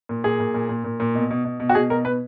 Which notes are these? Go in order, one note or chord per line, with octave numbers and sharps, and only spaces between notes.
A#2
A#2 G#4
A#2
A#2
A#2
A#2
A#2
B2
B2
B2
B2
F#4
B2 G#4
B2 A#4
B2 B4